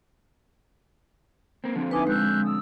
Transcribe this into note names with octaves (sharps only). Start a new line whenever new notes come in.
A#3 C4
D3 F3 C4
D#4 E4 B4 G#5 D6
G#3 E6 F#6 G6
D#6 E6